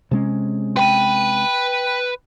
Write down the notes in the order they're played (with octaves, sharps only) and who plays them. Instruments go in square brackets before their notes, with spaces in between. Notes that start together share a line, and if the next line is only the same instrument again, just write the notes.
[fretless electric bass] C3 G#3 C#4
[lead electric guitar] B4 B5 [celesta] G5 D#7